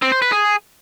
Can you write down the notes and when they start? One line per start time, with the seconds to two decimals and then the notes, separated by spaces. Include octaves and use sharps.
0.02 C4
0.12 C5
0.22 B4
0.32 G#4